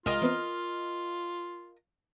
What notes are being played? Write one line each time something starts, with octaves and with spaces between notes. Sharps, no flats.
C2 G#3 F4 A#4 D#5 F5 E7
E3 B3 C4